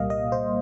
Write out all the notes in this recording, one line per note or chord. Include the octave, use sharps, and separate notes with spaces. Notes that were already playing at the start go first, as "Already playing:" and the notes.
Already playing: C2 A#2 G3 A#3 D#5 F5
D#5
C5